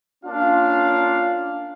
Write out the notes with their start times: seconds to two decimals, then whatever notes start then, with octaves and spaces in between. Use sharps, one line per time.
0.25 A#3 C#4 D4 F4 F5